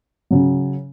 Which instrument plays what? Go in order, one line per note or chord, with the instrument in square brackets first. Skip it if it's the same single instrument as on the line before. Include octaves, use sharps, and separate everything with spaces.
[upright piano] C#3 F#3